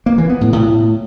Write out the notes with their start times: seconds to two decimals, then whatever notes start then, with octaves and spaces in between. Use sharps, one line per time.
0.06 A#3
0.18 E3
0.29 B3
0.41 A2
0.53 A2